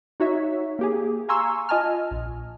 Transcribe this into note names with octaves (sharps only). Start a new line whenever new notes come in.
D#4 F#4 C#5 E5
A#3 G4 G#4
F5 G#5 A#5 C6 C#6 E6
F4 D#5 G#5 A5 F6
A#1